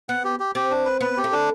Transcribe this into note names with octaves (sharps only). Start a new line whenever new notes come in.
B3 F#5
G4
G4
C4 G4
D4
B4
B3 B4
G4
A3
D4